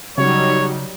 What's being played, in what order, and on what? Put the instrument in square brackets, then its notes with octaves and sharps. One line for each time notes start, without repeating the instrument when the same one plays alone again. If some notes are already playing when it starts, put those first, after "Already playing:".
[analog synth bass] C#3 [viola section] F#3 G3 D#4 [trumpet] C#5